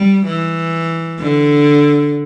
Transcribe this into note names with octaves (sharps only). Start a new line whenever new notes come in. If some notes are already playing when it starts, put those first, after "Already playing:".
Already playing: G3
E3
D3